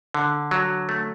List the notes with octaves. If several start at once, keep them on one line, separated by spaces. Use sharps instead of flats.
D3
F#3
A3